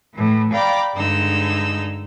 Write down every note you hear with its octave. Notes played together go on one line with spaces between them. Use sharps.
A2 E3
D5 F5 G5 A#5 B5 D6
G2 D3 G#3 D#4 E6